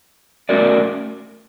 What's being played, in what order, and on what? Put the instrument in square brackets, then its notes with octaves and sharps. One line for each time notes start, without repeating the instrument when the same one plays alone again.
[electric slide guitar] A3 C#4 F#4 A#4 D5